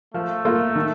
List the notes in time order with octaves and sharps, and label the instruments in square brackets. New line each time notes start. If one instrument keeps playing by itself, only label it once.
[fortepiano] F3 [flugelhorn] A3
[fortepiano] A#3 F4 A4
D#3